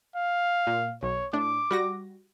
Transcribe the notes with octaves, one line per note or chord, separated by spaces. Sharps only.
F5
A#2
B1 C#5
A2 D4 D6
G3 F#4 A#6